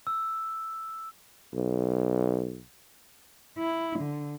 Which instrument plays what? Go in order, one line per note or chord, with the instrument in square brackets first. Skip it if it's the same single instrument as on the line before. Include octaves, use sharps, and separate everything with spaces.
[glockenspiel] E6
[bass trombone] B1
[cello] E4
D3